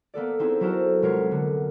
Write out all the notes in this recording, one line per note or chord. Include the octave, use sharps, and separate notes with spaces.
A#3 B3 A4 D5
B3 C4 D#4 E4 G#4
F#3 E4 F#4 A4 A#4 C5
F1 G#3 B3 A#4 C#5 C7
D3